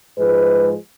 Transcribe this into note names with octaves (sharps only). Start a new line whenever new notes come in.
G#2 F3 G#3 B4